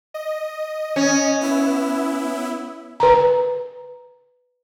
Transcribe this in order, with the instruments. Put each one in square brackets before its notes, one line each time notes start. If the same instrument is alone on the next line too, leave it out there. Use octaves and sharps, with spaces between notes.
[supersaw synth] D#5
[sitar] C#4
[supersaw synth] B3 E4 E5
[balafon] B4 A#5